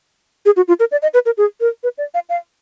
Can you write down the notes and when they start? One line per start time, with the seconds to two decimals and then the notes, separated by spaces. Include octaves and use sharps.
0.46 G#4
0.56 F#4
0.68 F4
0.80 A#4
0.92 D5
1.02 D#5
1.14 B4
1.26 A#4
1.38 G#4
1.61 A#4
1.83 B4
1.98 D5
2.14 F5
2.29 F5